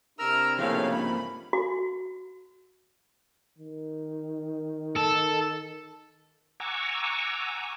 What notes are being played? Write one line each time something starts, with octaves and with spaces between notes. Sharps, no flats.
C3 D4 E4 A#4 A#5 E6 F6
A2 C#3 F3 A3 A#3 C#4 F5
G#2 B5
F#4
D#3
A4
F#5 G#5 A#5 C#6 D6 E6